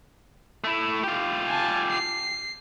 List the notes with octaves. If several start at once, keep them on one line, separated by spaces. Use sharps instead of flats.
A3 E4
F4 G4
G#5 A5
C7